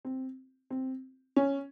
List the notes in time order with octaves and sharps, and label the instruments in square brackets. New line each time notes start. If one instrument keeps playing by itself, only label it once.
[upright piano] C4
C4
C#4